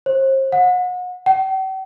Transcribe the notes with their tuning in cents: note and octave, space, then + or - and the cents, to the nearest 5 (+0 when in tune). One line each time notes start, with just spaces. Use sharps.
C5 +35
F#5 -35
G5 -45